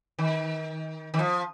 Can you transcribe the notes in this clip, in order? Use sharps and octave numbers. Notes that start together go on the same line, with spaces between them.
D#3
D#3
F3